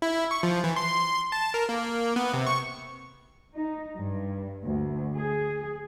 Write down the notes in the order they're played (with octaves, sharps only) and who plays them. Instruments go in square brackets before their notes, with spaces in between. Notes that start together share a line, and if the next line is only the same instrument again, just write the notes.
[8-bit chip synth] E4
C#6
F3
E3
C6
A5
A#4
A#3
B3
C3
C#6
[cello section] D#4
G2
D2
G#4